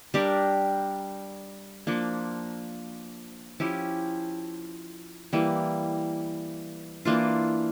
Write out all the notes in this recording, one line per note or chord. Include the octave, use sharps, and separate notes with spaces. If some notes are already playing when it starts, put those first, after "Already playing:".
G3 D4 G4 A#4
F3 A#3 D4
F3 C#4 E4 G4
E3 G3 A#3
E3 A#3 D4 F4